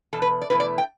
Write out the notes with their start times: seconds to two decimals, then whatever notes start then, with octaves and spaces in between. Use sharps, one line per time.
0.13 E2 B2 A4
0.22 B4
0.41 D5
0.50 E2 B2 A3 E4 B4
0.60 D5
0.78 G5